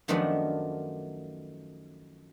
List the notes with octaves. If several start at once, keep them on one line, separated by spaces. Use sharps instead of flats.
F#2 D#3 F3 A3 B3 D4